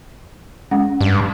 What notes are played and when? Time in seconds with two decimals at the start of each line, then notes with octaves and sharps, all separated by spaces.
0.71 G#3 C#4 F#5
1.01 G2